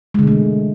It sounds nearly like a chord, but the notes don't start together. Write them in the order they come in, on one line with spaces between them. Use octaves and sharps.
G#3 D3 B2 A3 E3